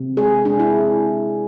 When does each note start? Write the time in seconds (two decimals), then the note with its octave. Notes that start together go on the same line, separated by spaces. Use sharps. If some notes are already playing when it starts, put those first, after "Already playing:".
Already playing: C3
0.17 G#3 G#4
0.45 G#3 D4
0.59 E4